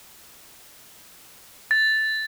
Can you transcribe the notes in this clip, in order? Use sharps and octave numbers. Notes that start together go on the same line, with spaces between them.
A6